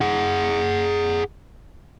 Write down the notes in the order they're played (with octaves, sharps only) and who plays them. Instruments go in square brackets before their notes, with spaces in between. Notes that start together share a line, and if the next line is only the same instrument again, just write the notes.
[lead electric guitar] G#4 F#5